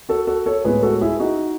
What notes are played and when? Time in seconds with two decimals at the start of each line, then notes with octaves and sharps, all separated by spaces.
0.09 F#4 A4
0.27 F#4 A4
0.46 A4 C#5
0.65 A2 G#3 B3 G#4 B4
0.83 F#4 A4
1.01 E4 G#4
1.20 D#4 F#4